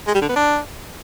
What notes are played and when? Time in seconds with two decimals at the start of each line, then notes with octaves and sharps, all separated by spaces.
0.07 G#3
0.14 G3
0.22 D3
0.29 B3
0.36 D4